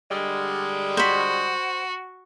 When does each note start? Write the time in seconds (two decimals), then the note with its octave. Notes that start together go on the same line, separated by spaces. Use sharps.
0.10 D3 G3 G#3
0.97 F#4 C5 B5